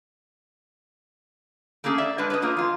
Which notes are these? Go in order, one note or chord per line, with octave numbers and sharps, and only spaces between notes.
A3 A#3 C#4 G#4 A4
D5 E5
G3 G#3 D4 B4 D#5
B4 C#5 D#5
A3 A#3 F4 D#5
F2 F4